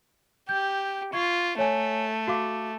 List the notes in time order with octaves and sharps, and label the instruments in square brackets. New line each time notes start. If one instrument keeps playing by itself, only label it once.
[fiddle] G4 [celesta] G6
[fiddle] F4 [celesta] C#6 G#6 C7
[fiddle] A3 [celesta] C#5 G#5
[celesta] F#4 F5 D6